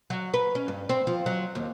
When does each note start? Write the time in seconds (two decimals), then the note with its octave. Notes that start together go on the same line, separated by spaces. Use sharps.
0.10 F#3
0.34 B4
0.55 C#4
0.68 G2
0.89 C4
1.07 F3
1.26 F#3
1.55 D#2